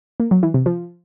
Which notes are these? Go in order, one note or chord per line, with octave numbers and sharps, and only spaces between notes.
A#3
F#3
E3
C3
F3